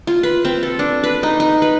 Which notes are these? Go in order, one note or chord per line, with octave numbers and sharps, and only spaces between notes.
F4
B4
C4
A4
D4
B4
D#4
D#4
B4